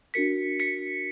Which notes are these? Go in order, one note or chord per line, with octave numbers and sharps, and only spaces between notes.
D4 F#4 A#4 B6 C#7
B6 C#7